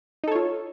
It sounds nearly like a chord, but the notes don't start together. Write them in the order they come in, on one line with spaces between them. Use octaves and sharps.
D#4 A4 C#5 F4